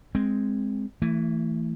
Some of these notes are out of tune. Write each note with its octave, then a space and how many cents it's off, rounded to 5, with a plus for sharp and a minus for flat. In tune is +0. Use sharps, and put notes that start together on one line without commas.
G#3 +0 C4 +0
E3 +0 A3 +30